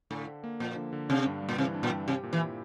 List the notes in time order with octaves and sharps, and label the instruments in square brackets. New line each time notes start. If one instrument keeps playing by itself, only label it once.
[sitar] A2 [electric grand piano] D3
[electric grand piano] D3
A#3
[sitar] A#2 [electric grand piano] F3
[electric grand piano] D3
D3
[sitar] C3 [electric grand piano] D4
[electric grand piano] G2
G3
[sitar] A#2
[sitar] C3 [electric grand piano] E3
[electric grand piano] D4
[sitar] A#2
[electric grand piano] G2
[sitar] C3 [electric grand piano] G4
[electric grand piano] A#2
[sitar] E3
[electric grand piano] E4